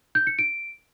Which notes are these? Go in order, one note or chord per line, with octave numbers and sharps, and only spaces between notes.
G6
C#7
D7